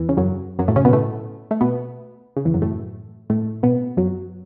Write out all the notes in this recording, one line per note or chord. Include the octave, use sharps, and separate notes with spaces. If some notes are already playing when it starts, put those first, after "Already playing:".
Already playing: E2 E3
C#3
F#2 F#3
F#2 F#3
A2 A3
C#3 C#4
B2 B3
A2 A3
A3
B2 B3
C#3
E2 E3
F#2 F#3
A2 A3
A2 A3
B2 B3
F#2 F#3